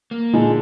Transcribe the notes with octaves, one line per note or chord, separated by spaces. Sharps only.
A#3
A#2 D3 G#3 D#4